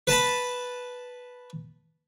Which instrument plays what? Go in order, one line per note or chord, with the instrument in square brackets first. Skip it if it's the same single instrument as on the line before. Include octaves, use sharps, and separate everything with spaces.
[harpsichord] B4 A5 B5